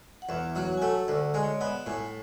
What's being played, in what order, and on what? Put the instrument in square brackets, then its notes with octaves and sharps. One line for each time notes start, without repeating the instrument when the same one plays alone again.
[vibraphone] F#5
[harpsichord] E2 [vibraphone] E5
[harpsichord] F#3 [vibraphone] F#5
[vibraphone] G#5
[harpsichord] A3 [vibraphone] F#5
[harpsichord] D2 [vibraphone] F#5
[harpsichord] G#3
[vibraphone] C#5
D5
[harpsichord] B3
[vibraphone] E5
F#5
[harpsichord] A2 [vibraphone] G#5